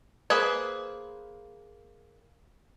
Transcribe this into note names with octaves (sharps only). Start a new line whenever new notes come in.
A#3 G#4 B4 C5